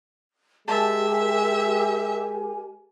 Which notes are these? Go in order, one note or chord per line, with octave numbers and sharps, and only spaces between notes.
G#3 G4 A#4 E5 G#5 A5